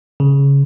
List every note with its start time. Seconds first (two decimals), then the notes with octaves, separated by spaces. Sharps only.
0.20 C#3